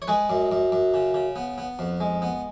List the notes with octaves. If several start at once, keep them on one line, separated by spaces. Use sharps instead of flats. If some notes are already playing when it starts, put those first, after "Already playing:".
C#5
G#3 G#4 B4
F#2
F#2
F#2
C#3
C#3
B3
B3
F2
G#3
B3